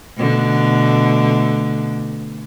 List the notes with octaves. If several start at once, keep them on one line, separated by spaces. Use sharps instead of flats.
B2 D3 A3